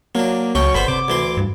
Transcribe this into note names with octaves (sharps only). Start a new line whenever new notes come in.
F#3 A#3 D4
C#2 F#3 C#4 G5 C#6
G1 D3 B3 C5 B5
C3 D6
D2 E3 C6
G2